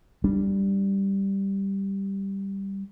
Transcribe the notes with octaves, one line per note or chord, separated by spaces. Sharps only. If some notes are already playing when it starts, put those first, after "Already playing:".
G3 D4